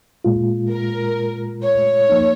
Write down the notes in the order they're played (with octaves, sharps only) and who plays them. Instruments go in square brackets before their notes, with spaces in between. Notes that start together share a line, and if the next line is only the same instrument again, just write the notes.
[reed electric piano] A#2 G#3 F4
[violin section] A#4
C#5
[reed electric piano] F3 A#3 D#4